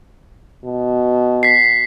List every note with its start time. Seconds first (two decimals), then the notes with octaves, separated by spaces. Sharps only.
0.65 B2
1.43 B6 C7